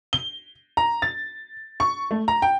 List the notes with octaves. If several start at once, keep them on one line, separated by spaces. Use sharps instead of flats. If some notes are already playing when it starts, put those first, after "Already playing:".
G7
A#5
A6
C#6
A3
A#5
G5